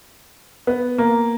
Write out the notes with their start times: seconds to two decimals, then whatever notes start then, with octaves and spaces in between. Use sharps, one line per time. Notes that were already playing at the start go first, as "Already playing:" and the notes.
0.67 B3
0.98 A#3